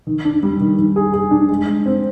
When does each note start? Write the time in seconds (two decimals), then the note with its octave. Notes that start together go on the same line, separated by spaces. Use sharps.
0.07 D#3
0.25 D4
0.43 G3
0.61 D#3
0.78 D#3
0.96 G#4
1.14 G#4
1.31 D4
1.49 G#3
1.67 G#3
1.86 C4